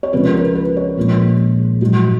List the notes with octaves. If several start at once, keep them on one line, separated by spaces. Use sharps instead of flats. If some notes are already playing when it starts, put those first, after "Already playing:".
C#5
C#2 C#3 F3 B4
A#4
B4
B4
C#5
A#1 A#2 G#3
A#1 G#2 F#3